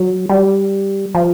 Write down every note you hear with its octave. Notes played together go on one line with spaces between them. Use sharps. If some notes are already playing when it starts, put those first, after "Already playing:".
Already playing: F#3
G3
F3